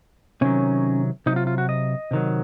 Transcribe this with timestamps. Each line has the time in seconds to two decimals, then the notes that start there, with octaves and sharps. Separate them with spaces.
0.41 C3 D#3 F#3 C#4
1.26 C3 F#3 D#4
1.36 F4
1.47 F4
1.58 F#4
1.69 D#5
2.11 C3 D#3 F#3